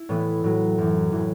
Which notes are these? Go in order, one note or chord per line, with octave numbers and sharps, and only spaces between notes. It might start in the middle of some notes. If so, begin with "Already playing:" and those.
Already playing: E4
A2 E3 B3
A2 F#3
F#2 E3
A2 E3